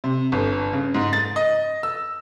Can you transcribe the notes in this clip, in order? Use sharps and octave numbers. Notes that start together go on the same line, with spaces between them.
C3
G1
C#3
G#2
A6
D#5
E6